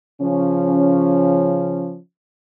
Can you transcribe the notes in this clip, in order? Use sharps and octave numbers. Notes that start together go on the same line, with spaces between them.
C#3 F3 C#4